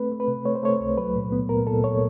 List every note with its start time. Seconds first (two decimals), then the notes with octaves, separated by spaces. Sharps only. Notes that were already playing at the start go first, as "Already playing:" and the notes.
Already playing: A3 C4 B4
0.12 A3
0.20 B4
0.28 C3
0.45 A3 C#5
0.55 C5
0.63 A3 C#5
0.80 C#2
0.98 F#3 B4
1.16 A#2
1.32 B3
1.49 A#2 A#4
1.67 A#2 A4
1.84 A#2 C#5